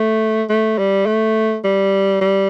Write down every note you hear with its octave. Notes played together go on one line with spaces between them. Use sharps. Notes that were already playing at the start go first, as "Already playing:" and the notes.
Already playing: A3
A3
G3
A3
G3
G3